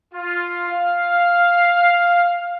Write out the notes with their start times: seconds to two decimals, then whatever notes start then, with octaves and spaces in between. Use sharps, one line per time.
0.14 F4
0.69 F5